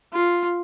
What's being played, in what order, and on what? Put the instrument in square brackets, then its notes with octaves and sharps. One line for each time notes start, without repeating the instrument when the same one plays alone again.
[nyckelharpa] F4